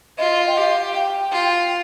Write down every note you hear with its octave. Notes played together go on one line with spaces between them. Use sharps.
F4 D#5
G5
G4 F5
G5
F4